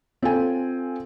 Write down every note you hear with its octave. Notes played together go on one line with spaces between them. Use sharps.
C4 F4 A4 G#5